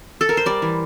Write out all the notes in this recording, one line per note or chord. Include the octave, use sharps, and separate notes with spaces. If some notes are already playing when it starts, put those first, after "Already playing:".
A4
A#4
C5
G3 D5
E3